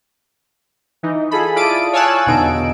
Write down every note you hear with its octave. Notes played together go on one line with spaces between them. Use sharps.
E3 D#4
F4 G#4 A4 B5
E4 F4 D5 A5 D#6 D7
C#5 F5 G#5 A5 E6 F#6
E2 B2 D3 D#4 D7